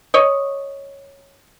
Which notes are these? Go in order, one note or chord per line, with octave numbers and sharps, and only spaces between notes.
C#5 D#5